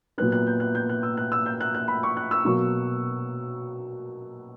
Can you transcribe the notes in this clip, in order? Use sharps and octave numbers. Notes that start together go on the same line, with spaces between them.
A#2 F#3 B3 F#6
F#6
G6
F#6
G6
F#6
E6
F#6
E6
G6
F#6
F#6
B5
C#6
F#6
E6
B2 F#3 A#3 C#6